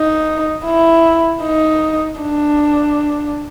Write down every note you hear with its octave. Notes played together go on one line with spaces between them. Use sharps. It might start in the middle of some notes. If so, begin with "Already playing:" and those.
Already playing: D#4
E4
D#4
D4